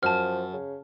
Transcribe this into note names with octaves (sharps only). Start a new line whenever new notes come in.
F#2 F3 A5 F6
C#3